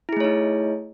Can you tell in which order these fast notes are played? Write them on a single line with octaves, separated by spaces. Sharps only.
E4 G#4 A3 C#5 D#4